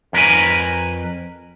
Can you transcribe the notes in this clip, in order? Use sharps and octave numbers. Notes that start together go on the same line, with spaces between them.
F2 A#4 B4 G#5